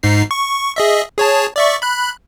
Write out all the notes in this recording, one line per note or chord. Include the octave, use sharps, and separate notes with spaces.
G#2 D#4 C7
C#6
G#4 D#5 E5
G#4 C#5 A5
D5 E5 C#6
B5 F#6